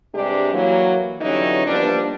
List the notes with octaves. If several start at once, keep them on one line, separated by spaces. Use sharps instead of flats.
G2 C3 G#3 D4 G4
E3 F#3 A#3
D3 E3 F#3 G3 C#4 D#4
F3 G3 A#3 B3 D4